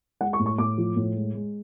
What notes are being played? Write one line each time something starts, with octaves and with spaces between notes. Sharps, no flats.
G#3 F#5
C#6
A2
C#6
A2 D6
F3
A2
G#3
G#3